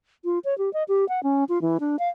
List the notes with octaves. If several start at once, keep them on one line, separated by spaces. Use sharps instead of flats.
F4
C#5
G4
D#5
G4
F#5
C#4
F4
E3
D4
F5